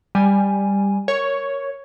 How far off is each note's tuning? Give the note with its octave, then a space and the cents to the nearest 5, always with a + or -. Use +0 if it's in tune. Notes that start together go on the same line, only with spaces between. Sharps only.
G3 +10 G#5 +0
A#4 +0 C#5 +0